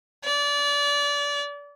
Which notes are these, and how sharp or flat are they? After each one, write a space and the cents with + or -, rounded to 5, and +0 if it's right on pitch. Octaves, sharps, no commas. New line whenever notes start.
D5 -30